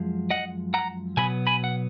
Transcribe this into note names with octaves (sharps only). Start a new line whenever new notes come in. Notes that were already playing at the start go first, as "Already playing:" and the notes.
Already playing: F#2 F3 G#3
D#5 F#5
F#5 A#5
B2 F#3 B3 G#5 B5
G#5 B5
F#5